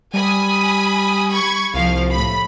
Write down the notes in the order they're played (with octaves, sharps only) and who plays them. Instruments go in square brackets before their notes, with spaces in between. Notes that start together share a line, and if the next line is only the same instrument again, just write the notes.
[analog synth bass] G3 [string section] G#5 B5 D#6
[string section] B5 C#6 G#6
[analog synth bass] C2 [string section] F3 F5
[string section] A2 B5